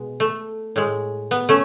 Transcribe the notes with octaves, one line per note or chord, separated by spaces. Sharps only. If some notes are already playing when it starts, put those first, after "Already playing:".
Already playing: B2 G#3
A3
A2 G#3
B3
A3 C#4